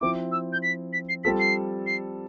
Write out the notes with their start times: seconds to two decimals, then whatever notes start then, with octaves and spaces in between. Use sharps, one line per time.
0.01 F3 C4 E4 D6
0.32 E6
0.53 G6
0.63 B6
0.93 B6
1.09 C7
1.24 G3 C4 F4 A4 B6
1.40 C7
1.86 C7